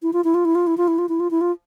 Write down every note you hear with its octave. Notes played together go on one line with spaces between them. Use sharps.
E4
F4
E4
F4
E4
F4
E4
F4
E4
F4
E4
F4
E4
F4